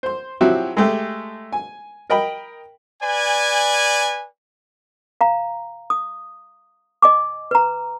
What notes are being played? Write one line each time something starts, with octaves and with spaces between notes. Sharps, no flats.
C5 C6
F3 F#3 C4 E4 F#4 G4
G#3 A3 G4
G#5
A#4 D#5 G5 B5
B4 D5 G#5
F5 A#5
D#6
D#5 G#5 D6
B4 A#5